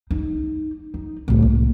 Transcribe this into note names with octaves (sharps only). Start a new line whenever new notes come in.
D#4
D#4
C2 A2
A#3